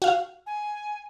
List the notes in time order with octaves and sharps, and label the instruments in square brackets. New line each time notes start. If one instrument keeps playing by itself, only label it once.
[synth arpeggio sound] F#4 F5
[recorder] G#5